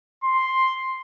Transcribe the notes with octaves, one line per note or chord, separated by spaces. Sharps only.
C6